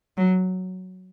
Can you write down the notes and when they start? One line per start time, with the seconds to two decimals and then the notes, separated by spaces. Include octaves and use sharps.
0.18 F#3